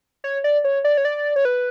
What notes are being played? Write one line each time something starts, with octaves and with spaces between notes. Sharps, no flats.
C#5
D5
C#5
D5
C#5
D5
C#5
B4